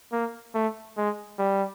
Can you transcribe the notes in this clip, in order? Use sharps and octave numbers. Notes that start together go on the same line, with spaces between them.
A#3
A3
G#3
G3